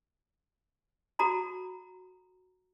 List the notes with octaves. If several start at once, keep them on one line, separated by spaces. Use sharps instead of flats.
F#4 A4 A#5 B5